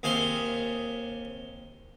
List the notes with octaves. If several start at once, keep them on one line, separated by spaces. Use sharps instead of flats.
D#2 C3 G#4 F5 C6